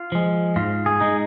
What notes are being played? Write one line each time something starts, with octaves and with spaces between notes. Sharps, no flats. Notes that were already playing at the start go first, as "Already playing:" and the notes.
Already playing: F4
F3 G#3
G#2 F4
G#4
G#3 D#4